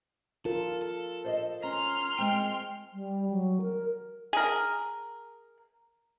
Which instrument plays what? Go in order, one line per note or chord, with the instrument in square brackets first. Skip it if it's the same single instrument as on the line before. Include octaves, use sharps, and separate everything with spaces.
[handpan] F4 A#4 [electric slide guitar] A4
[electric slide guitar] A4
[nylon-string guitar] C5 D5 D#5
[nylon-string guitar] C#4 [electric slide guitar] A#5 [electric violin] C6 F6
[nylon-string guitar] G#3 C4 [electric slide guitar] G5
[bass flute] G3
F#3
A#4
[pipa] G#4 A#4